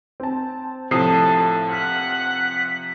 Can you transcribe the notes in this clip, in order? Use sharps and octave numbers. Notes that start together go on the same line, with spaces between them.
C4 A5
A2 C3 F3 A4 A5 D#6 C7
F#5 F6 F#6 B6